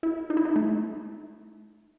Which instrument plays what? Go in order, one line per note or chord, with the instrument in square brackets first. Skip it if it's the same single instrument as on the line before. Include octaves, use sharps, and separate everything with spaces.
[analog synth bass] E4
D#4
E4
D#4
A3